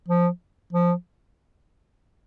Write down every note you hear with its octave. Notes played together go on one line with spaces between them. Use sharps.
F3
F3